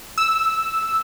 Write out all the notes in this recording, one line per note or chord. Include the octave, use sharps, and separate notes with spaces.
E6